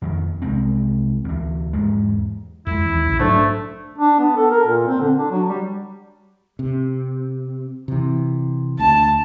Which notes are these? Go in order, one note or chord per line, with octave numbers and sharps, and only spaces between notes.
F2 D#3
C2 G#3 C4
D2 E3
E2 G#2 G#3
F2 G#3 E4
D#2 E3
A#1 C#3
G#2 F#3 A3 D4 A4 C5
D4
B3
A4
A#4
A#2
C4
D3
D4
F#3
G3
C3
C3 E3
D2 A5